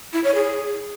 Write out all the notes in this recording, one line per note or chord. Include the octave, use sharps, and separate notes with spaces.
E4
C#5
G#4